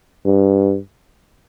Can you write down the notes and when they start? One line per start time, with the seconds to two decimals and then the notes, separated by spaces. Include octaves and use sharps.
0.25 G2